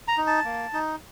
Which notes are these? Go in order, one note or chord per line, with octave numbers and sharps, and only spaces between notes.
A#5
D#4
A5
A#3
D#4